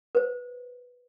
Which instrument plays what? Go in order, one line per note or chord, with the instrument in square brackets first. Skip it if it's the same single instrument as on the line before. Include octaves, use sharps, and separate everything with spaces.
[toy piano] B4 C5